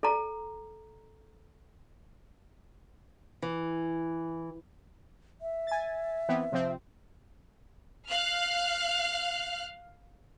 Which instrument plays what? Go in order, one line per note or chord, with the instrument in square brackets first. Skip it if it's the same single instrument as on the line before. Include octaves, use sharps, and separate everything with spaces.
[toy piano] A4 A#5
[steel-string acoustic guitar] E3
[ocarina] E5
[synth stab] G#5 A6
E3 B3 C4
C3 F3 C4
[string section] F5 F6 F#6